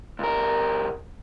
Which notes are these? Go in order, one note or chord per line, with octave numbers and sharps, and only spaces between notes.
C#2 A#4